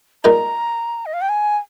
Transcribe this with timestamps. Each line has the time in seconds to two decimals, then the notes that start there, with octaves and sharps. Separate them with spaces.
0.24 A#2 G#3 D#4 A#4 A#5
1.06 D#5
1.13 F5
1.21 G5
1.29 G#5